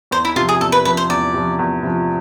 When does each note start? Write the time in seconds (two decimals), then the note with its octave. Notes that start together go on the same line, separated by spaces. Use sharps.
0.11 E2 C5
0.25 E4
0.36 C3 F4
0.40 F3
0.49 G#4
0.60 E2 A4
0.72 B4
0.85 C3 F3 B4
0.97 C5
1.10 E2 D5
1.34 C3 F3
1.59 E2
1.83 C3 F3